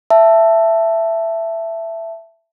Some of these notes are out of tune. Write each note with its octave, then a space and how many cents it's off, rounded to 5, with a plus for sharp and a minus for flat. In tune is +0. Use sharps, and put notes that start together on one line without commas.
E5 +10 A5 +0